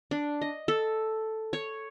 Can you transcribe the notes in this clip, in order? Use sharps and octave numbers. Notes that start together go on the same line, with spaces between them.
D4
D#5
A4
C#5